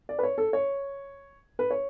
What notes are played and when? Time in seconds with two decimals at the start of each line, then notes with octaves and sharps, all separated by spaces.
0.09 D5
0.19 B4
0.23 C#5
0.38 A4
0.53 C#5
1.59 B4
1.71 C#5